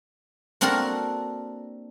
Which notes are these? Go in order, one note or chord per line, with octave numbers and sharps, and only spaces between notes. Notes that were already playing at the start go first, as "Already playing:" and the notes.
A#3 C4 D4 F#4 A4 A#4